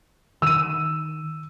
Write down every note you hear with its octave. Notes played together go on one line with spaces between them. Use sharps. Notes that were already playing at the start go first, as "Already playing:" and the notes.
D#3 E6 D#7